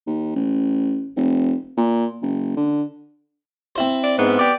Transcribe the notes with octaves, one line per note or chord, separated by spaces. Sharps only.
D#2
A1
F1
A#2
F#1
D3
C4 E4 C5
D5
G#2 B3
G4 D5